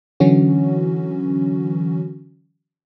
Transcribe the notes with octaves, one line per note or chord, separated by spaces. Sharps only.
D3 E3 F#3 C#4 F#4